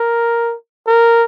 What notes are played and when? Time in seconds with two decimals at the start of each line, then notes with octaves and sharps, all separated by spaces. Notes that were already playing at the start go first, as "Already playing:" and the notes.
Already playing: A#4
0.87 A#4